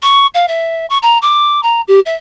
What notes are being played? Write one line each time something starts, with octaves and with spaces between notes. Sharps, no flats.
C#6
F5
E5
C#6
A#5
D6
A#5
G4
E5